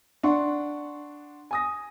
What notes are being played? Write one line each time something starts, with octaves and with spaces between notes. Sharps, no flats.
D4 F#5 C6 C#6
G#5 D#6 A#6